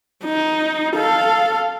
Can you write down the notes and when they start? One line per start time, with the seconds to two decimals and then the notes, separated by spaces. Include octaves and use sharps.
0.24 D#4
0.96 A4 F5